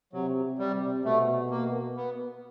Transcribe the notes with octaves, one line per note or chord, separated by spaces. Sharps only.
C3 F#3
C3
G3
C3
B2 A3
A#3
B3